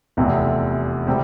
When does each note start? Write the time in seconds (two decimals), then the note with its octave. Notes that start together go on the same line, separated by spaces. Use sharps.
0.17 F1 E2 C3 E3
1.07 C3 G3 C4